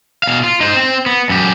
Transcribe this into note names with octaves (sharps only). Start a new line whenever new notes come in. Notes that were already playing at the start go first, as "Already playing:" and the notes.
B2 F5
F4
D#4 C5
C4
B3
F#2 G4